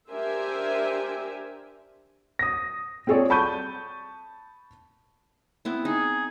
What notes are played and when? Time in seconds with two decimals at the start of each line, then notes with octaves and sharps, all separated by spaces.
0.10 D4 G4 A#4 C5 E5 G#5
2.39 D#6 A#6
3.07 C4 F4 G#4 A4 C#5 D5
3.30 A5 B5 C#6 G6 D#7
5.65 B3 C4 E4
5.85 D#4 G#4